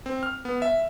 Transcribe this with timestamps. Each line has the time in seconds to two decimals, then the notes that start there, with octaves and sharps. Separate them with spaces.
0.06 C4
0.23 F6
0.45 B3
0.62 E5